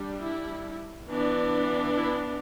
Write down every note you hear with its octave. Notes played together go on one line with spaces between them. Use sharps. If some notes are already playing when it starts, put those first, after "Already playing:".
Already playing: G3 D4
E4
E3 B3 D4
E4